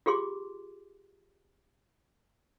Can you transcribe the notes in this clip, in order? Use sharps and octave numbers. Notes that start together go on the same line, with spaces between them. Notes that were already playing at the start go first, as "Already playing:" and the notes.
F4 G4 G#4 C6 D6